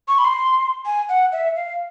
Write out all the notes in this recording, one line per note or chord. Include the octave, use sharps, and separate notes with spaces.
C#6
B5
C6
G#5
F#5
E5
F5